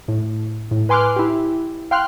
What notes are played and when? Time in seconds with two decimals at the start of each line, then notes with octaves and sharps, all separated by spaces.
0.08 A2
0.71 A2
0.89 B4 G#5 C6 D6 F6 F#6
1.16 E4 G4
1.91 F5 G5 C6 F6 F#6